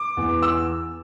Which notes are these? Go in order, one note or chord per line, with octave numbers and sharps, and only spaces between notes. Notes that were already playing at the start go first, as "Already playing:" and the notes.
Already playing: D6
E2
E6